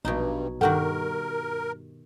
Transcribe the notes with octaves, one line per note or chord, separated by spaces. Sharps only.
A#1 G2 B2 F#3 D#4
G2 D#3 F#4 G4 A4 A#4 F#5 G5